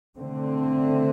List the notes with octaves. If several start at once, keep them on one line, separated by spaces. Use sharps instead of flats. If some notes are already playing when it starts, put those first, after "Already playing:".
D3 A3 C4